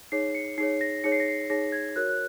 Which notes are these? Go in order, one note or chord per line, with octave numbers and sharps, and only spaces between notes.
D#4 G#4 C#5 C7
C#7
D#4 G#4 C#5 C7
A#6
D#4 G#4 C#5 C#7
C7
A#6
C7
D#4 G#4 C#5 A#6
G#6
F#4 A#4 C#5 F#6
F#6